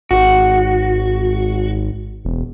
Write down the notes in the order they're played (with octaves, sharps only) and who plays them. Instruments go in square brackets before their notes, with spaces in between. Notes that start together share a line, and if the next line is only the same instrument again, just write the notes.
[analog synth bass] G#1 [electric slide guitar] F#4
[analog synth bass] E1